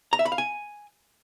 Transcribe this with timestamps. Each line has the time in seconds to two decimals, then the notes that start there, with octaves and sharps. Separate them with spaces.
0.13 A#5
0.19 E5
0.25 B5
0.32 F5
0.38 G#5